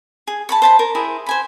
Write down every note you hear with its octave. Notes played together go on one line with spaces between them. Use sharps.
G#4
A5 B5 C#6
C5 A5 B5
A#4
E4 G#4 C5
C5 G#5 B5